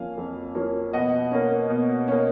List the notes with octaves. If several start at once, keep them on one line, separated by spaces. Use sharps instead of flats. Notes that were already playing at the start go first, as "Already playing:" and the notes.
Already playing: F2 F3 A#3 C#4 F5 G#5
F2
F3 A#3 C#4
B2 D#5 F#5
A#3 C#4
B2
A#3 C#4